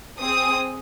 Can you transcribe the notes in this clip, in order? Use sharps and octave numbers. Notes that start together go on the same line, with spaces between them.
C4 G#4 D#6